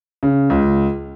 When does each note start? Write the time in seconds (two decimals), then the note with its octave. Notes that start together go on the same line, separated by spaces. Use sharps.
0.23 C#3
0.50 C#2